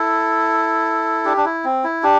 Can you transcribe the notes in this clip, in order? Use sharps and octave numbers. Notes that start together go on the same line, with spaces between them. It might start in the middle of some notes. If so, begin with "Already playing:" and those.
Already playing: E4 A4
D4 G4
D4
E4
C4
E4
D4 G4